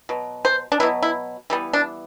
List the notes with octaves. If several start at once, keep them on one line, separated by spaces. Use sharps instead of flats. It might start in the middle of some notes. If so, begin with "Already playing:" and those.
B2 F#3
C5
D4
B2 F#3 B3 E4
E4
E3 G3 B3
D4